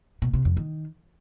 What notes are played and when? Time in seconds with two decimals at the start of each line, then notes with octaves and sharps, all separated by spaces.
0.22 B2
0.34 C3
0.45 F2
0.57 D#3